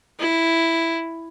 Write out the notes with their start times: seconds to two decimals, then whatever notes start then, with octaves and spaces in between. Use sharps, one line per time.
0.20 E4